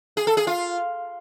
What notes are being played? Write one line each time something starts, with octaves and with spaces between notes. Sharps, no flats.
G#4
A4
G#4
F4